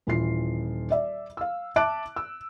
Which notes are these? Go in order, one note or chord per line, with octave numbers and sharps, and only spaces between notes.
D#1 E3 F4 C7
D5 E5
F5 E6
E5 A5 D6 F#6 D7
E6